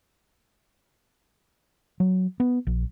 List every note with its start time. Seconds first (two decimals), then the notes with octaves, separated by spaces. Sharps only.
2.00 F#3
2.40 B3
2.67 A#1